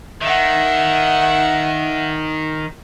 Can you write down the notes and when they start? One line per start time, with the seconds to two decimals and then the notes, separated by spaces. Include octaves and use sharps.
0.22 D#3 E5 F#5